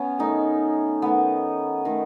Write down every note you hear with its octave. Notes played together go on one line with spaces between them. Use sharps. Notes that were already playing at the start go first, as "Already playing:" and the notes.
Already playing: B3 C#4
D#3 A3 D#4
D#3 A3 B3
D#3 A3